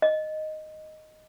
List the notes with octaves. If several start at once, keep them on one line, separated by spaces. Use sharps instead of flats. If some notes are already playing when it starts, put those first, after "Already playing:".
D#5